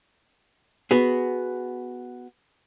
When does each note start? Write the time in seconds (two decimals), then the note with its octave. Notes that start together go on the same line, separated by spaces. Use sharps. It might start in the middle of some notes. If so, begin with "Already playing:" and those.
0.91 B3 F#4 G#4